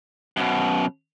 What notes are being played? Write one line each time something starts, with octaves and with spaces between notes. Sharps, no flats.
F#2 B2